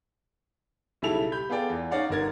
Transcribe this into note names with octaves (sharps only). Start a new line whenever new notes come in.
B1 C#3 G3 E4 A4 F7
G4 B5 G6
B3 F4 G#4 A4 D5 G5
E2
C#4 D#4 C#5 D5 F5 F#5
G1 D3 D#4 A#4 G#6 A6